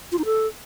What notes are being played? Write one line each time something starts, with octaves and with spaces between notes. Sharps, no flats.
F4
D#4
A4